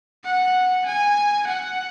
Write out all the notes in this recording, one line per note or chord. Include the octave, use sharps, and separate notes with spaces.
F#5
G#5
F#5